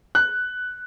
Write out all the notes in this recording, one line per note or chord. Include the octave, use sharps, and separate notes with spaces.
F#6